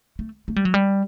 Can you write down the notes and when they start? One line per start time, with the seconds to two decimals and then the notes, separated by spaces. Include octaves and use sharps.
0.19 A3
0.48 A3
0.56 G3
0.65 F#3
0.74 G3